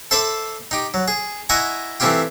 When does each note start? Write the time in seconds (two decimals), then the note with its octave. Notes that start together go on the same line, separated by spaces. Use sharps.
0.11 A4 C5 E5 B5 C6 D6
0.71 D#4 G4
0.94 F#3
1.08 G#4
1.49 E4 D#5 F#5 G#5 A#5 C#6
2.00 E3 A3 C4 E4 F4 G4